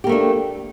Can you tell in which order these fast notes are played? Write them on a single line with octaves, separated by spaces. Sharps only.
G4 A#3 A3 D4